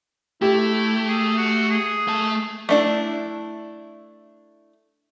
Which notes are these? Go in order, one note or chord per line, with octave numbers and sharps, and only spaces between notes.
A3 E4 G4
G#4
F#4
G#4
A3 A5
A3 D4 E4